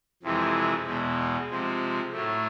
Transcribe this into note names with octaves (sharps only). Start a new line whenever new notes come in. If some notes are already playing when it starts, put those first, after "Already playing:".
F2 C3 E3 G#3
E2 B2 G#3
C3 F3 G#3
A2 F#3 A3